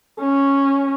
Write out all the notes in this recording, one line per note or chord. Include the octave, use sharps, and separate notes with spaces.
C#4